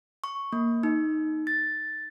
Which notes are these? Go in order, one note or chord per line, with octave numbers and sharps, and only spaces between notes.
C#6
A#3
D#4
A6